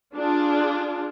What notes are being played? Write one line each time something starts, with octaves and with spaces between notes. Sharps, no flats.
D4 F4 G#4